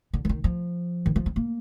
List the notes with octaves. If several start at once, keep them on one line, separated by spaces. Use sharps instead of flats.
D3
F3
D#3
F3
D#3
F3
C4
A#3